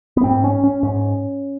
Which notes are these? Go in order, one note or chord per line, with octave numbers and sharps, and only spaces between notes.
B3
G#2 C4
C#4
C#4
G#2 C#4